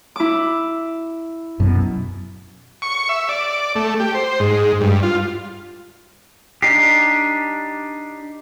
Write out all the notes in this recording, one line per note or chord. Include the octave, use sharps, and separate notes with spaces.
E4 D6
F#2 B2
C#6
E5
D5
A3
G4
C5
G#2
G2
F4
D4 D#4 G4 B6 C7